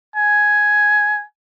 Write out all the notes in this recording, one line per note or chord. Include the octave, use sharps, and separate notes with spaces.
G#5